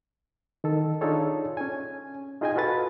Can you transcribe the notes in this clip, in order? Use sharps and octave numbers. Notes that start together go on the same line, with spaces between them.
D#3 A4
D4 D#4 F4 G#4 A4 C#5
C#4 G#5
D#4 F4 G#4 D#5 G5 G#5
F4 F#4 A4 B4 A6